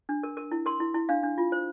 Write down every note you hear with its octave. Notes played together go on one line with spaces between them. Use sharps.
D4
A#4
A#4
E4
A#4 C6
E4
E4
D4 F5
D4
F4
C5